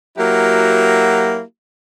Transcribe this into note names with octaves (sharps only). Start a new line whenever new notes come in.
F#3 A#3 E4 F#4 G4